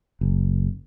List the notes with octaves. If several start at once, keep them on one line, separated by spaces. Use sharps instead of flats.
F#1